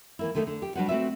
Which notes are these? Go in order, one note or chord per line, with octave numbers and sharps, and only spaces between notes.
E3 A#3 E4
D3 D#3 A3 B3 D#4
D3
G4
G3 D4 F#4 B4 C5 F#5
A3 C4 F#4 B4 D5 E5